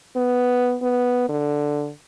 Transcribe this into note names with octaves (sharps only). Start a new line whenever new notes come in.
B3
B3
D3